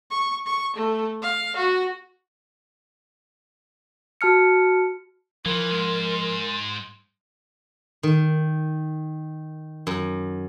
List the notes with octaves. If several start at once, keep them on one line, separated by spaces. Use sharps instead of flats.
C#6
C#6
A3
F5
F#4
F#4 A5 F6 C#7
E3 F3 A#4 C6
G#2 G#3
D#3
F#2